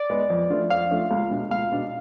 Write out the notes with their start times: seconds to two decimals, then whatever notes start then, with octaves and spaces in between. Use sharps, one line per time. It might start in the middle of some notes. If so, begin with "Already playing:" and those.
Already playing: D5
0.10 G#3 B3
0.30 F2
0.50 F3 A3 D4 F4
0.70 F2 F5
0.91 F3 A3 D4 F4
1.11 C#2
1.31 B2 G#3 D4
1.51 C#2 F5
1.72 B2 G#3 D4